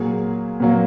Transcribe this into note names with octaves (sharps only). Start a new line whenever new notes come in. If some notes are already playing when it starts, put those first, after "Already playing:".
Already playing: A#2 F#3 A#3 G#4
A#2 F#3 A#3